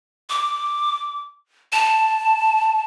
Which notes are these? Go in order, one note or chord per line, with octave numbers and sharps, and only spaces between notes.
D6
A5